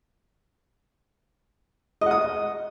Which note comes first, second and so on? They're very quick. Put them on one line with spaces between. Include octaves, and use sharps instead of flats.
D#5 F#5 D#6